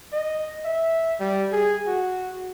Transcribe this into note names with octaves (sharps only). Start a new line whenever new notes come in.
D#5
E5
G3
G#4
F#4